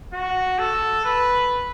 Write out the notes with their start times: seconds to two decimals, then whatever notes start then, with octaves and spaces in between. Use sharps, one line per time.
0.13 F#4
0.59 A4
1.05 B4